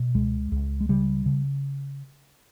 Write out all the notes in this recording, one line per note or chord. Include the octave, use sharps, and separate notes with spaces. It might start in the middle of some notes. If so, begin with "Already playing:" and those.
Already playing: B2
C#2 G#3
C#2
G#3
C#3 G3
C#3